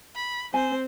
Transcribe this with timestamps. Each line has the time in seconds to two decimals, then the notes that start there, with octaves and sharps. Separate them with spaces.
0.15 B5
0.54 C4 C5 G#5